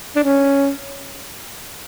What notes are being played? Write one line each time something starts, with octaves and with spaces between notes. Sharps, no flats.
D4
C#4